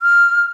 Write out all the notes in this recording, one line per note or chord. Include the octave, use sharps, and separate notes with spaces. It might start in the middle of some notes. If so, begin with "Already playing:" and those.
F6